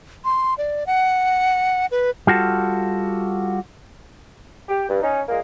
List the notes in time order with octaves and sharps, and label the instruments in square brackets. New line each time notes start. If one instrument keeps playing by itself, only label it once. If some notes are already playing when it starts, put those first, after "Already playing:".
[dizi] C6
D5
F#5
B4
[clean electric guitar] G3 F4 F#4 A4
[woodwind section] G4
G2
C#4 D#4
A#2 G#3 A#3